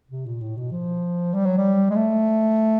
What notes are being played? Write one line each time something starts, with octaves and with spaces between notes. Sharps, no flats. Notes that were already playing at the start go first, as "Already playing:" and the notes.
C3
A#2
A2
B2
F3
G3
F#3
G3
G#3
A3